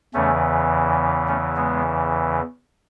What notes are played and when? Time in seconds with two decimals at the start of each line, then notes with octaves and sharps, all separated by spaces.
0.14 E2 C#3 E3 A3 C#4
1.28 A3 C#4
1.56 G#3 B3